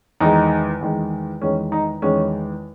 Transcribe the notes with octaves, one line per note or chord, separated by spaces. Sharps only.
E2 D#3 G#3 D#4
E2 D#3 G#3
E2 D#3 G#3 C#4
D#4
E2 D#3 G#3 C#4